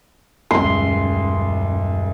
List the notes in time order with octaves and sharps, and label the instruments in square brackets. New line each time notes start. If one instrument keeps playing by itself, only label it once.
[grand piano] D#1 C#2 [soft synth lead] F#2 [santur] C6